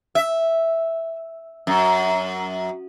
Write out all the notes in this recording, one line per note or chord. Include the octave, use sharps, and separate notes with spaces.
E5
F#2